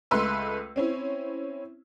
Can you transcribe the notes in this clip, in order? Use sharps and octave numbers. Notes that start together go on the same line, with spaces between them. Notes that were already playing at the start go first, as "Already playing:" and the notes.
C#2 A3 B4 C6 E6
C4 C#4 E4